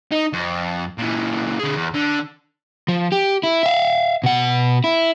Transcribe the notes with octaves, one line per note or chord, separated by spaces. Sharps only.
D#4
F2
A#2 E3
D3 G#4
E2
D3
F3
G4
E4
E5 F5
B2 F#5
E4